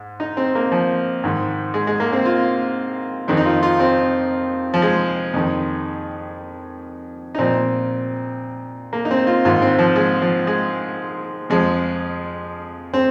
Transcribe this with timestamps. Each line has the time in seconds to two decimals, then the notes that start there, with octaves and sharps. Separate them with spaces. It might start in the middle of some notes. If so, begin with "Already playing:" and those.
Already playing: G#2
0.20 D#4
0.37 C4
0.55 A#3
0.72 F3
1.24 G#2 D#3
1.74 G#3
1.87 G#3
2.00 A#3
2.12 C4
2.25 F4
3.28 F2 D#3 C4
3.37 D#4
3.45 F4
3.63 F4
3.79 C4
4.74 F3
4.82 G#3
5.34 F2 D#3
7.35 D#4
7.39 A#2 F3 C4
8.93 A#3
9.05 D#4
9.11 C4
9.27 F4
9.45 G#2 D#3 F4
9.62 C4
9.79 F3
9.96 G#3
10.22 F3
10.47 G#3
11.50 F2 F3 G#3
12.94 C4